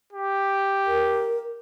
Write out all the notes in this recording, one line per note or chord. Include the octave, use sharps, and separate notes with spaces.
G4
A#4